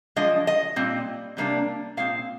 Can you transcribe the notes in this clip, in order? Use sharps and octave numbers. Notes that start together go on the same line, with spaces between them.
F3 G#3 D4 D#5
D#5
A#2 G3 C4
C3 G3 A#3 D4
A#2 G#3 C4 F5